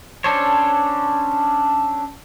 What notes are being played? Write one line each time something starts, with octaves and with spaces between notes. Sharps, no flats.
C#4 D4 A4 C5 C#5